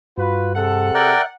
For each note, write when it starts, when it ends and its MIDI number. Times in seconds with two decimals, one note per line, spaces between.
0.18 0.91 43
0.18 0.55 65
0.18 0.55 66
0.18 0.55 71
0.56 1.13 48
0.56 1.13 68
0.56 1.13 69
0.56 1.34 78
0.95 1.21 70
0.95 1.21 74
0.95 1.26 76
0.95 1.21 79
0.95 1.26 90